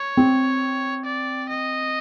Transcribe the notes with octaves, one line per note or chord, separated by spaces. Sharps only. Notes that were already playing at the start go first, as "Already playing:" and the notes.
Already playing: C#5
C4
D5
D#5